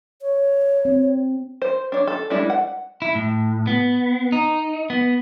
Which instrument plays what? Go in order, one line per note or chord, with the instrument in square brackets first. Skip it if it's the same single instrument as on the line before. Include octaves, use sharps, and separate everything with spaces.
[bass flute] C#5
[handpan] C4
[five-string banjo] C5
D4 C#5
A4
G3 G#3 D4 E4
F#5
[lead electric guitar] E4
A2
B3
D#4
B3